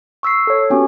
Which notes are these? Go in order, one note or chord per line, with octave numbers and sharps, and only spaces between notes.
C#6 E6 B6 C7
A4 C#5
B3 C#4 F#4 G4